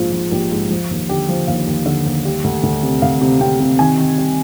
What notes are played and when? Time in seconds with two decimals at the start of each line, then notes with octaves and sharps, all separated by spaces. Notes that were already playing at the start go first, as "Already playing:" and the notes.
Already playing: A#1 G#2 F3 F4
0.13 F3
0.32 A#1 G4
0.51 G#2
0.70 F3
0.91 D#2
1.09 D3 G4
1.29 F3
1.47 D#2 F5
1.67 D#2
1.86 D3
2.06 D#2
2.25 G3
2.44 D2
2.63 D2
2.83 C3
3.02 D2 F5
3.21 C3
3.41 C3 G5
3.60 C3
3.79 D#3 G#5
3.98 D#3
4.18 G3